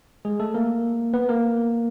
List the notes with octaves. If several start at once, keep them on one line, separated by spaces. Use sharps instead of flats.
G#3 G#4
A3 A4
A#3 A#4
B3 B4
A#3 A#4